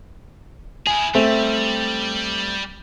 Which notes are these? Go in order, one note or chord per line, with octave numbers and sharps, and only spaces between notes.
E4 G#4 G#5
G3 A3 C4